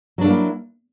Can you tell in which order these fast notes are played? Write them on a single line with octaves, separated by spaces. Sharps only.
F#3 D4 A3 A#3 E4